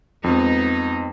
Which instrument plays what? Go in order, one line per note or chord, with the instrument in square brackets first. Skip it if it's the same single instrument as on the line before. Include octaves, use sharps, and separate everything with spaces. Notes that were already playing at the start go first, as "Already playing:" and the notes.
[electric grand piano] F2 [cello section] G#3 B3 D#4